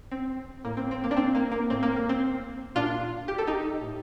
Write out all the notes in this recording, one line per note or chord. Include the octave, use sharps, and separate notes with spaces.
C4
A2 A#3
C4
C4
A#3
D4
C4
A#3
A#3
A2 C4
A#3
A#3
C4
A#2 D4 F4
G4
A4
D#4 G4
A2